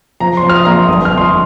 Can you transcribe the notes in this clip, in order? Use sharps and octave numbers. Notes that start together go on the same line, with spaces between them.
F3 A#5
C6
F3
F6
D#6
A#1 A#5
C6
G1 D#6
F6
F2
C6
D#6